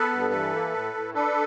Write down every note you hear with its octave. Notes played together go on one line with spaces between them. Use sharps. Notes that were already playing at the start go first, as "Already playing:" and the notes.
Already playing: B3 A4 B4
G2
E3
A#3
A2
A2
D4 A4 B4